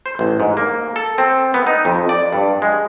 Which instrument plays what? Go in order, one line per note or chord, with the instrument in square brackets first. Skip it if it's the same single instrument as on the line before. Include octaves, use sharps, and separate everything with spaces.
[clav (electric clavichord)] C5
A1
G#2
A#3
A4
C4
B3
D#4
F2
D5
G2
G#3